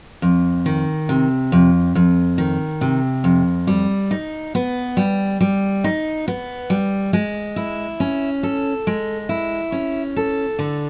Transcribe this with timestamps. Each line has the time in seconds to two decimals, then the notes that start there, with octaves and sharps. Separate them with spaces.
0.22 F2
0.66 D#3
1.09 C3
1.52 F2
1.95 F2
2.38 D#3
2.81 C3
3.24 F2
3.67 G3
4.11 D#4
4.55 B3
4.97 G3
5.40 G3
5.84 D#4
6.28 B3
6.70 G3
7.13 G#3
7.56 E4
8.00 C#4
8.43 A4
8.87 G#3
9.29 E4
9.72 C#4
10.16 A4
10.59 D3